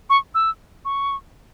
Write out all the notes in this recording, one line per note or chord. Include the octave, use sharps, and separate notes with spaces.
C#6
E6
C#6